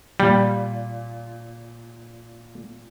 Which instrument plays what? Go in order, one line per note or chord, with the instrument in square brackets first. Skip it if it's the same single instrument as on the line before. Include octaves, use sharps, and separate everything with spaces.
[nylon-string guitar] A#2 [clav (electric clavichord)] G3